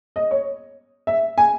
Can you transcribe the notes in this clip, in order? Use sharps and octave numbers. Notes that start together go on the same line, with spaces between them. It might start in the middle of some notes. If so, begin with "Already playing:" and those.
D#5
C#5
E5
G#5